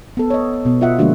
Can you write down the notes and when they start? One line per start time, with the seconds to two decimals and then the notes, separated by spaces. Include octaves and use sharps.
0.17 B3 A4
0.30 C#5 D#5
0.65 B2 B3
0.81 F4 D#5 E5 F#5
0.99 D3 F3 G#3 A#3 D4 F#4